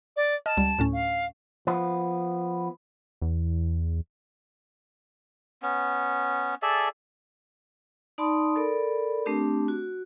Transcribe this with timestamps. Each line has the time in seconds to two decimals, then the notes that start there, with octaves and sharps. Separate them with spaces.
0.16 D5
0.46 D#5 A5 F6
0.57 C#2 G3
0.79 D2 A2 C#4
0.92 F5
1.67 F3 B3
3.21 E2
5.62 B3 C#4
6.62 G#4 A4 D5 E5
8.18 D#4 D5 A5 B5 C6 D#6
8.56 A4 A#4 D5 B5
9.26 A3 C4 D4 G4
9.68 F#4